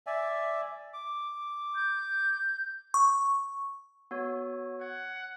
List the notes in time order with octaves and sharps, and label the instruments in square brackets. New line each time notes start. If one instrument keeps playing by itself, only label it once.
[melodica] D5 E5 G#5
D6
[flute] G6
[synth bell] C#6
[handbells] B3 F#4 C#5
[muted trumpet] F#5 [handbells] G#6